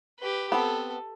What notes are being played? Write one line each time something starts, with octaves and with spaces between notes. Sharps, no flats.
G4 B4
B3 C4 A4